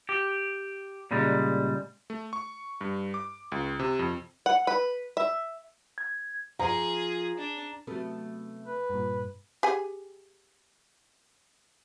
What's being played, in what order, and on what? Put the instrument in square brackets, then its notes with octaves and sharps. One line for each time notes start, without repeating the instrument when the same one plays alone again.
[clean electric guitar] G4
A#2 C#3 G3 G#3
[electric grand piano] A3
C#6
G2
D6
C#2
C3
F2
[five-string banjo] F#5
B4
E5
[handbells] G#6
[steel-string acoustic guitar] F3 [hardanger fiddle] G#4 [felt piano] A#5
[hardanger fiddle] D4
[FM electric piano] C3 F#3 [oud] A3 B3
[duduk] B4
[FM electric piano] G2 A#2
[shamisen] G4 G#4 G#5